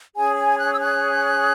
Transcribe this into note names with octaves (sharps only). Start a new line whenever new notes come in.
C#4 G#4 C#5 G#5
G#5
F#6
E6
F#6